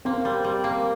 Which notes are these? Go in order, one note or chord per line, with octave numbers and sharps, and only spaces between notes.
A#3 C4
G3
G3
A#3